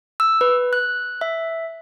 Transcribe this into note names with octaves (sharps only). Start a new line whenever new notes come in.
E6
B4
F#6
E5